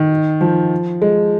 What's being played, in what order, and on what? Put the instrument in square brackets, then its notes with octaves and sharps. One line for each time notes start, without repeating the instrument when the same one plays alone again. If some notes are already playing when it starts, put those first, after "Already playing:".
Already playing: [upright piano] D#3
F3
G#3